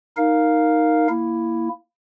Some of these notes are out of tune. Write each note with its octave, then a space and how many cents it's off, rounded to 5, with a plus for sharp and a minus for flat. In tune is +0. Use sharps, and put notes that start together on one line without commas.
D#4 +0 A#4 +0 F5 +5
A#3 +0 E4 +5